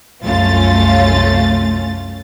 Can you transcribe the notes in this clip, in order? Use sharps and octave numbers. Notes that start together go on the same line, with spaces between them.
C2 F#2 A3 C#4 F4 A6